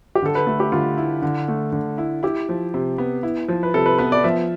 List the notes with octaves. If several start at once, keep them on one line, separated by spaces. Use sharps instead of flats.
G4
D3 A4
B4
A3 A4
G4
D3 F4
E4
D3
A3
D3
E4
E4 G4
F3
C3
B3
E4
F3
B4
C3 A4
B4
B3 B4
D5
F3 E5